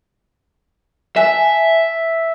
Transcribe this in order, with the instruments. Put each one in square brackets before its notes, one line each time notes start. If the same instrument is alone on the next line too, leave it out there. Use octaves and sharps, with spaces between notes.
[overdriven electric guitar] E5 [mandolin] G#5 A5 F#6